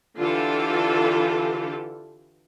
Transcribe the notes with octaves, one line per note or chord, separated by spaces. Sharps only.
D3 E3 F4 G4 A4